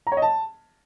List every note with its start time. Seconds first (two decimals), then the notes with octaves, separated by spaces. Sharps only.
0.07 A#5
0.12 C#5
0.17 D#5
0.22 A5